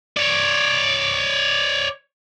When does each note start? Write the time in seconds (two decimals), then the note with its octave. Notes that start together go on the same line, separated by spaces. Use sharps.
0.17 C#5 D5